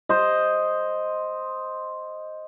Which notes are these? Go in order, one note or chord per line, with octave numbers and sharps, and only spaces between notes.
C5 D#5